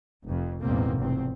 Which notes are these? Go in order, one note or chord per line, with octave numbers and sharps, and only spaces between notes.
F1 F2
A1 E2 G#2 B2 A#3 C4
F1 E2 C4